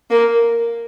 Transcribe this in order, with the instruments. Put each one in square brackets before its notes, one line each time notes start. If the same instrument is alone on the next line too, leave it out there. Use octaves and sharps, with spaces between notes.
[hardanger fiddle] A#3